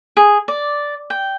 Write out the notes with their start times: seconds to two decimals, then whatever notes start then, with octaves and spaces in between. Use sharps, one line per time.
0.17 G#4
0.48 D5
1.10 G5